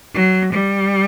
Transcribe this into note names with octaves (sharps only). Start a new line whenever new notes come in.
F#3
G3